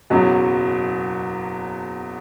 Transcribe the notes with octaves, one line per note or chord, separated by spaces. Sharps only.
F#1 E2 B2 F#3 C#4